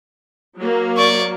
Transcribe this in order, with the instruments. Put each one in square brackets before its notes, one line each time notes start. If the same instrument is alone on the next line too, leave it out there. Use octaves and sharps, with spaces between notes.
[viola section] F#3 A#3
[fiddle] D5 C#6